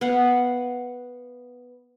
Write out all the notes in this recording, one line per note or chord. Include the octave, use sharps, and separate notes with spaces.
B3 F5 F#5